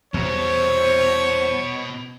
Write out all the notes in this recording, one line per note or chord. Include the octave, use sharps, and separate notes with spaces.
E2 B2 G3 C5 C#5